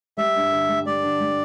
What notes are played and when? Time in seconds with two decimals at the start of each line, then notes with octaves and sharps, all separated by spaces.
0.17 G3 E5
0.36 G2
0.52 D3
0.69 G3
0.86 G3 D5
1.03 D3
1.21 G3